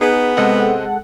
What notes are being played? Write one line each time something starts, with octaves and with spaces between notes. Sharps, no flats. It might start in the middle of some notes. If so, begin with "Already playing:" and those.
B3 D#4 G#4 B4
C3 G#3 C4 A4 D#5 F#5